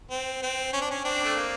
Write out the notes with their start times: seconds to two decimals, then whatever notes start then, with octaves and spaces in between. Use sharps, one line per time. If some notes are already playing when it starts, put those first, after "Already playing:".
0.11 C4
0.42 C4
0.73 C#4
0.81 D4
0.91 C#4
1.04 C4 D4
1.24 A3
1.36 A#3